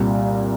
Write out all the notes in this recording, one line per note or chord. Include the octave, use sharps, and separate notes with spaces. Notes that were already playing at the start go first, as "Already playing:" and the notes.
Already playing: C2 A#2 G3